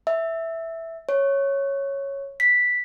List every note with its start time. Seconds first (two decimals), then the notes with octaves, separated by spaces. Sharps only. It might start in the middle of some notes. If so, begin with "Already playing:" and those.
0.07 E5
1.09 C#5
2.40 B6